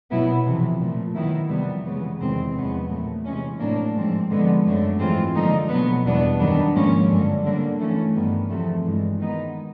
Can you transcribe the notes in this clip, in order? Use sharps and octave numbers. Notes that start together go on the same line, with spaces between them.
B2 F#3 B3 E4
F2 C3 E3
A#2 F3 A3
D#3 F#3 B3 E4
F2 C3 E3 G3 B3
C#3 E3 G#3 B3
E2 C3 D#3 G#3 C4
E2 C#3 F3 G#3 B3
A#2 F#3 A3
C3 E3 G#3 C#4
A2 F#3 A#3 D4
G#2 F3 G#3 C4
D3 F3 G#3 B3
F#2 D3 F#3 A3 D4
G#2 E3 G#3 C4 F4
D3 F3 A#3 D#4
B2 F#3 B3
E2 B2 G3 B3 D4
F#2 D#3 G3 B3 D4
G#2 F3 A#3 C#4
G2 D3 F#3
D3 G3 A#3
E3 A3 C#4
G2 D#3 G3 B3
E2 C3 F3 A3
G2 E3 G#3
D#3 G#3 B3 D#4